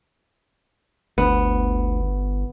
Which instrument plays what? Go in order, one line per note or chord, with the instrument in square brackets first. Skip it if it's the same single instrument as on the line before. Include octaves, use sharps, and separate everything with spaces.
[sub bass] G1 [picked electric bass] D2 [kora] B3